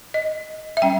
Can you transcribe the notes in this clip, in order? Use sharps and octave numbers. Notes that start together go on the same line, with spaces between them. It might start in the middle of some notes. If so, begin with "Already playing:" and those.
D#5
E5
G3 C#4 G5